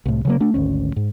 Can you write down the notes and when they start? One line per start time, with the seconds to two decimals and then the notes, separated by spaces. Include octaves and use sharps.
0.06 C2 A2
0.25 C#3 F#3 A#3
0.40 A3 D4
0.54 G#1 D2 C#4
0.96 G#2